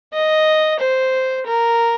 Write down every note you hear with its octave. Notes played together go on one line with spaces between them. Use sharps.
D#5
C5
A#4